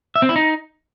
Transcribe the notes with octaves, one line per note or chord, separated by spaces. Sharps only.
E5
C4
E4
D#4